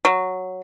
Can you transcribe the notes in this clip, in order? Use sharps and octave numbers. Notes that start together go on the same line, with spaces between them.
F#3